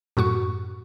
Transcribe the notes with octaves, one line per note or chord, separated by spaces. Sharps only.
F#2 A2 F#4 C#6